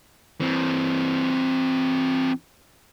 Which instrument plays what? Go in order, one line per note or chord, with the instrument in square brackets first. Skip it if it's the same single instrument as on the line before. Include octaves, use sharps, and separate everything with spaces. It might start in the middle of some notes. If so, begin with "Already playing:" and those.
[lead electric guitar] E3 C4